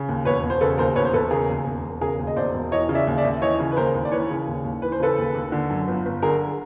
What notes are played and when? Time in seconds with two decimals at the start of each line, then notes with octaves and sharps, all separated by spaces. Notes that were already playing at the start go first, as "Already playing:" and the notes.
Already playing: C#3
0.09 D#2
0.25 E1 B4 C#5
0.43 E1
0.50 C5
0.61 C#3 A4 B4
0.78 D#2 A#4 C5
0.96 E1 B4 C#5
1.05 C5
1.13 E1 A4 B4
1.31 C#3 G#4 A#4
1.49 D#2
1.66 E1
1.85 E1
2.01 C#3 G#4 A#4
2.19 D#2
2.27 D#5
2.36 E1 C5 D5
2.54 E1
2.72 E3 C#5 D#5
2.89 C#3
2.95 D5 E5
3.07 D#2
3.18 D5 E5
3.25 D#2
3.42 E3 C#5 D#5
3.60 C#3
3.72 B4
3.77 D#2 A#4 C5
3.95 D#2
4.05 D5
4.12 E3 B4 C#5
4.30 C#3
4.48 D#2
4.65 D#2
4.82 E3 B4
4.92 C5
5.00 C#3 A4 B4
5.18 D#2
5.35 D#2
5.52 D3
5.70 F#2
5.88 G1
6.06 G1
6.22 D3 G#4 A#4